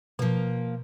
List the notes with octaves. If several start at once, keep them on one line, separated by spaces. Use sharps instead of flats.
B2 F3 A#3